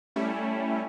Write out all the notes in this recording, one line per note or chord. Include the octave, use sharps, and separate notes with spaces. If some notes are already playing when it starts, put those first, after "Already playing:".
G3 A3 C#4 E4